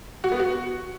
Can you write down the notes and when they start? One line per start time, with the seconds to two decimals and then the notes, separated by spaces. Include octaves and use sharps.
0.24 F#4
0.32 B3
0.40 F#4